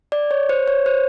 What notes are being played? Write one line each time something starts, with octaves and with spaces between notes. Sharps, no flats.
D5
C#5
C5
C#5
C5